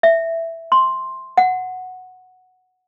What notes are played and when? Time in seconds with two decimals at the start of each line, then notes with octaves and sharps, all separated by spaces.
0.03 E5
0.72 C6
1.37 F#5